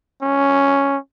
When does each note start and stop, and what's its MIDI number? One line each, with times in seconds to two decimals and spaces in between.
0.22 0.97 61